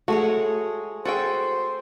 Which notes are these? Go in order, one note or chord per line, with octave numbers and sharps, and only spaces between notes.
G#3 A3 F#4 G#4 C#5
F#4 G#4 A4 C5 G5